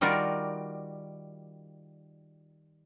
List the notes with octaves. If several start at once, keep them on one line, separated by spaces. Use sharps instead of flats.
D#3 G3 F4 F#4 A#4 D5